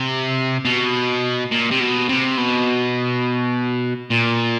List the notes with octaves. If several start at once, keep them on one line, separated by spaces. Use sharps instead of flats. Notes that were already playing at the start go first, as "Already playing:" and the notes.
Already playing: C3
B2
A#2
C3
B2
C3
B2
A#2